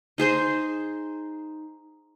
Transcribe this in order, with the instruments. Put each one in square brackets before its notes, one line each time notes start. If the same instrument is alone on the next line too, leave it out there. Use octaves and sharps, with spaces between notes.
[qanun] D#4 G#4 C5 C6